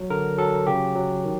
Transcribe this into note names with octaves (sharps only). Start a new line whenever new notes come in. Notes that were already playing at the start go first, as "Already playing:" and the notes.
Already playing: F#3
D3 A#4
F#3 A4
C#3 G4
F#3
D#3